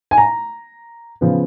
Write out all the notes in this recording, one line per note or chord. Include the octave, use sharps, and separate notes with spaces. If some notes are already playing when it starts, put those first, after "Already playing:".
G#5
A#5
C#3 F3 B3